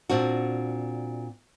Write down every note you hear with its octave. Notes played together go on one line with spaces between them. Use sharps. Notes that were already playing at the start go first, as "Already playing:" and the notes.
A#2 C4 D4 F#4